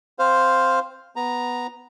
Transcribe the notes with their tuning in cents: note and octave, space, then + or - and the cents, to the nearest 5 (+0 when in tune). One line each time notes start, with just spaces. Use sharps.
C4 +0 C5 +0 F5 +0
B3 +0 A#5 +0